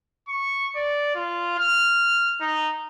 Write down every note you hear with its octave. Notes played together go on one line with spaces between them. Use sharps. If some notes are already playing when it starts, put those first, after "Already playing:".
C#6
D5
F4
F6
D#4